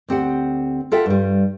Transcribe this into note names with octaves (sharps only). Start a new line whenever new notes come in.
D2 C4 G4 F#5
F4 F#4 A4 E5 F#5 G5
G2 G3